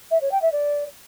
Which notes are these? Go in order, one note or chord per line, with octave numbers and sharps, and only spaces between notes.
E5
C#5
G5
E5
D5